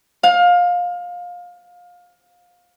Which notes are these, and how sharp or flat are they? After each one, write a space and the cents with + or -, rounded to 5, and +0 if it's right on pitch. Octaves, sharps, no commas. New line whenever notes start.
F5 +25